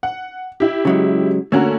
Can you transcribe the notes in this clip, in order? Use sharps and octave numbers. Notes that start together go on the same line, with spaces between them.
F#5
E4 G4
C#3 F#3 G#3
D3 A3 A#3 C#4 F#4 A#4